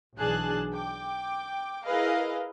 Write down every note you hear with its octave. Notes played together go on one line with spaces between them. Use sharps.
B1 E3 D4 G#4 A5 F#6
G5 D6
E4 G#4 A#4 B4 D#5 F5